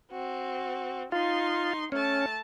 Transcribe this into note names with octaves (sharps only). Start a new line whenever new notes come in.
C4 F#4
D#4 F4 C6
A3 C#4 A5